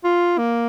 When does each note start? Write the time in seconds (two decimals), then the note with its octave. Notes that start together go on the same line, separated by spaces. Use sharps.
0.04 F4
0.38 A#3